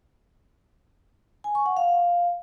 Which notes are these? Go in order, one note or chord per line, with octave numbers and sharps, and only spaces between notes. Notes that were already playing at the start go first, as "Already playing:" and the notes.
G#5
C#6
F#5
F5